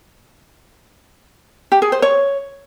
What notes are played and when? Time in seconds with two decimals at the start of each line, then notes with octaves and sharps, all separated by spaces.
1.72 G4
1.82 G#4
1.92 C5
2.02 C#5